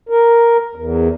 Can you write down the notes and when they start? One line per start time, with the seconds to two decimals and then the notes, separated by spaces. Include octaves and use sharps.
0.09 A#4
0.75 E2